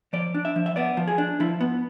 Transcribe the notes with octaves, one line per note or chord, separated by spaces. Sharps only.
F3 D5
D4
E5
F3
E5
B3 D5
F3
G#4
D4
F3 E4
B3